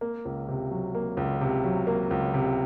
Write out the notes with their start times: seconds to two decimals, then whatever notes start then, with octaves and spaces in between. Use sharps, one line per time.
0.01 A#3
0.25 C#2
0.48 C3
0.71 F#3
0.95 A#3
1.17 C#2
1.41 C3
1.64 F#3
1.87 A#3
2.11 C#2
2.34 C3